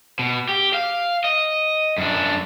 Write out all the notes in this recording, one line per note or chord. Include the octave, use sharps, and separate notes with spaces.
B2
G4
F5
D#5
F#2 D4